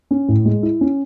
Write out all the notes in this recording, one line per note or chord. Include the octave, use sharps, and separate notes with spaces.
C#4
A2
G#3
E4
C#4